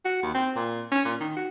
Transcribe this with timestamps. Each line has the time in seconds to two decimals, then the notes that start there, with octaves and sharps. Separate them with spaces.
0.05 F#4
0.23 D#2
0.34 C4
0.56 A#2
0.91 C#4
1.05 A#2
1.20 D#3
1.36 F#4